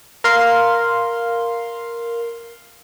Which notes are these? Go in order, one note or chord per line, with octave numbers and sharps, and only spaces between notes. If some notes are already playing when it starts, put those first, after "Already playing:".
A#4 F5 C6